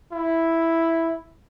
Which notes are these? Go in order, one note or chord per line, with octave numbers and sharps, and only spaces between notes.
E4